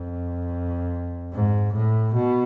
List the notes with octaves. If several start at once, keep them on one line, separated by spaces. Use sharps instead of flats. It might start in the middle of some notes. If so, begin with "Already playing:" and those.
Already playing: F2
G#2
A2
B2